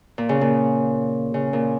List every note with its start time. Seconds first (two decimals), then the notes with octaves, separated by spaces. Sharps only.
0.18 A#2
0.29 C#3
0.41 A#2
1.34 C#3
1.53 A#2